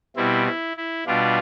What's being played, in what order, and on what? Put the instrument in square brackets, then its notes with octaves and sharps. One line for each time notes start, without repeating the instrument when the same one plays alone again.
[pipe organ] B2 G3 C4 E4
E4
E4
B2 G3 D4 F4